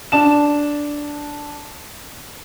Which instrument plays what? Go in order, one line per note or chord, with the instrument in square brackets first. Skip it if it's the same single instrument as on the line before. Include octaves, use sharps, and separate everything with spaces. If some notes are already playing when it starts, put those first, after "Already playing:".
[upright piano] D4 A5 E7